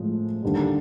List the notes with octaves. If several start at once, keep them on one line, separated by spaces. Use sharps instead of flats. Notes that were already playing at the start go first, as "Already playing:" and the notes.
Already playing: A2 F3 G#3
D#2 D3 G3